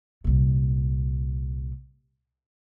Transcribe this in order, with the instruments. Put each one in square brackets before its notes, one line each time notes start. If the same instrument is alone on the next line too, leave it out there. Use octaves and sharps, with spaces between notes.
[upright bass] C2 A#2